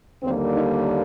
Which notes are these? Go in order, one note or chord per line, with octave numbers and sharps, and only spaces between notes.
D#2 D3 G3 A#3 C4
D#4